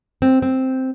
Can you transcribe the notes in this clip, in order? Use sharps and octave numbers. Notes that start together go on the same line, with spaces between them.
C4
C4